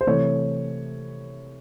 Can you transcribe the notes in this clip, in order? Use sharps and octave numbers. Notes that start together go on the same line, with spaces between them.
C5
C3 E3 A3 C#5